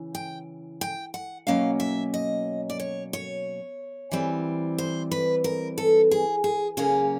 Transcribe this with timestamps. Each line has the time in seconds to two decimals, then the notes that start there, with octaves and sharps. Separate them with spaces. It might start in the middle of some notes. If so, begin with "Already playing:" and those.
Already playing: C#3 E3
0.15 G5
0.81 G5
1.14 F#5
1.47 B2 F#3 A#3 C#4 F5
1.80 E5
2.14 D#5
2.70 D5
2.80 C#5
3.13 C#5
4.11 E3 G3 C4
4.78 C5
5.11 B4
5.44 A#4
5.78 A4
6.11 G#4
6.44 G#4
6.77 C#3 F#3 A#3 C#4 G#4